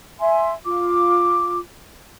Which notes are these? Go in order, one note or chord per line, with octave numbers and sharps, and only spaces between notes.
E5 G#5 C6
F4 D6